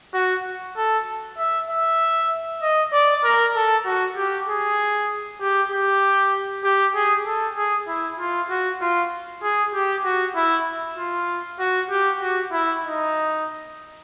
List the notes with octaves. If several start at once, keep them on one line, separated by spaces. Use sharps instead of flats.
F#4
A4
E5
E5
D#5
D5
A#4
A4
F#4
G4
G#4
G4
G4
G4
G#4
A4
G#4
E4
F4
F#4
F4
G#4
G4
F#4
E4
F4
F#4
G4
F#4
E4
D#4